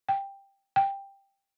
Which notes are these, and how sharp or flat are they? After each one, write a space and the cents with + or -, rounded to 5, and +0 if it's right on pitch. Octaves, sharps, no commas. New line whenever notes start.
G5 +10
G5 +10